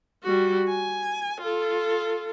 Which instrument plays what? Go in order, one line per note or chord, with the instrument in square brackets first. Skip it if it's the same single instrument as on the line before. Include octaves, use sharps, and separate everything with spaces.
[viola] G3 F#4
G#5
F4 A4